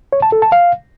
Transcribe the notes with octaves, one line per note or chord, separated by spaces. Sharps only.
C#5
A5
A4
A5
F5